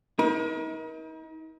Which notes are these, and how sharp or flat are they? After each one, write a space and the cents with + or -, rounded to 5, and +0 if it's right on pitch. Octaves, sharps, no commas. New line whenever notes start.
D#4 +40 A#4 +40